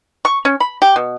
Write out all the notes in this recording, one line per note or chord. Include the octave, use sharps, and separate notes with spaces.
C#6
C#4
B5
G4
B2